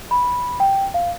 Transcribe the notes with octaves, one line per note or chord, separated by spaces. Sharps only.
B5
G5
F5